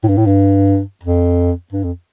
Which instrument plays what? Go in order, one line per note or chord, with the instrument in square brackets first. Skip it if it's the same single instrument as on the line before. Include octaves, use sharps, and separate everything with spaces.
[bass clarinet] A2
G2
A2
G2
F2
G2
F2